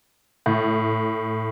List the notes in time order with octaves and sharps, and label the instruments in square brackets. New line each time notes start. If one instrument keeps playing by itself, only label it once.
[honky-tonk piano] A2